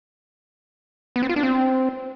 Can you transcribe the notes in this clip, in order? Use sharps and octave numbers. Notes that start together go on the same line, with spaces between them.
B3
C4
F4
D4
C4